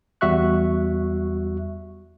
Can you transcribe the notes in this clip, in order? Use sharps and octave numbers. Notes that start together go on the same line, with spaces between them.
E2 G3 F#4 E5 C#6 F#6